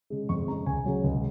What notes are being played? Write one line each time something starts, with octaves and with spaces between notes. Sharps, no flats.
C#3 G#3
F2 C#6
C#3 G#3 A#5
C#2 G#5
C#3 F#3
C#2